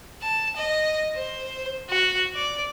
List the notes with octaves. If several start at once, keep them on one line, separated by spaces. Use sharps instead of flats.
A5
D#5
C5
F#4
D5